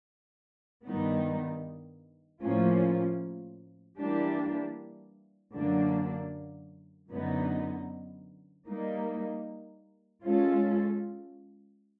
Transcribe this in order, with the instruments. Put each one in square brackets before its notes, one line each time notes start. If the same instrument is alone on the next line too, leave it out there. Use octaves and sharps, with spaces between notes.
[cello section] G2 D#3 G3 B3 D#4
A2 F3 A#3 C#4 F4
E3 G3 A#3 D4 G4
F#2 D3 F#3 A#3 D4
F#2 D3 F#3 B3 D#4
G3 A#3 D#4
G#3 C#4 F4 A4